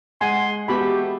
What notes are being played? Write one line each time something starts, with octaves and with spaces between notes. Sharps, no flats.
G#3 F#5 G#5 C6
A3 B3 F#4 G4 B5